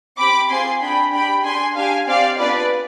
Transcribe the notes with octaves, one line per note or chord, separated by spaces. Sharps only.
C4 G4 B5 D6
C4 F4 G#4 G#5 C6
D4 G#4 G5 B5
D4 G4 G5 B5
D4 G#4 G#5 C6
D4 G4 F5 G#5
C4 G4 D5 F5
B3 D4 F4 G#4 B4 D5